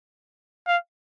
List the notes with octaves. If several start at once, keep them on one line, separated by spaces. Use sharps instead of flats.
F5